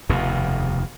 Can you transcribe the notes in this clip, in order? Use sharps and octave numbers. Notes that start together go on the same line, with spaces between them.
F1 D#2 B2